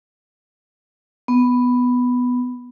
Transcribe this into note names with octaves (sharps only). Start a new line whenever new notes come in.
B3